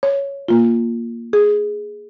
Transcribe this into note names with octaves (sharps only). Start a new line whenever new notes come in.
C#5
A#3 F4
G#4